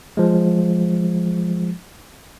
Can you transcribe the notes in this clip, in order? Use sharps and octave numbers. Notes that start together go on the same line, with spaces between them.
F3 G#3